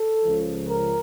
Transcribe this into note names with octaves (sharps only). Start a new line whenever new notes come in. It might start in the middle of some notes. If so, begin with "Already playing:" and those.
Already playing: A4
C#2 C#3 F3
A#4